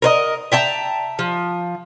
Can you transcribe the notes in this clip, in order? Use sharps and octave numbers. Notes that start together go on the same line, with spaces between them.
A#4 B4 D#5
E5 G5 A5 A#5
F3